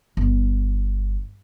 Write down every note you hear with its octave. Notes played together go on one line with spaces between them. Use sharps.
G1